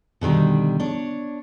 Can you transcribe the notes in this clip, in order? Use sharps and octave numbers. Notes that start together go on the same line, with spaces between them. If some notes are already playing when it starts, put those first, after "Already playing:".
B2 D3 D#3 G3
D4 C#5